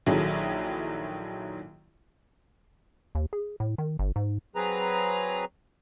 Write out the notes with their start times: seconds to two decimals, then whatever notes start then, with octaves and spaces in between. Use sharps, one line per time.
0.06 A#1 D#3 F#3 E4 G#4 A4
3.15 D#2
3.33 G#4
3.60 A2
3.78 D#3
3.99 G1
4.16 G#2
4.56 F#3 C4 G#4 B4 A#5